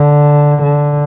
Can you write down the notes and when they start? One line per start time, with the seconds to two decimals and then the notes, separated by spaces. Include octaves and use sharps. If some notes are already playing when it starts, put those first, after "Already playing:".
Already playing: D3
0.63 D3